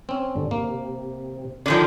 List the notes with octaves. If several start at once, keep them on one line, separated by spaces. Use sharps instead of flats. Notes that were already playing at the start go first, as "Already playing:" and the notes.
C4 C#4
G2 D3
C3 A#3
D3 D#3 F3 C#4 G#5 B5 D6